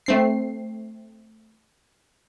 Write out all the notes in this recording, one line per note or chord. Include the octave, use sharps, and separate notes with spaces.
A3 C4 C7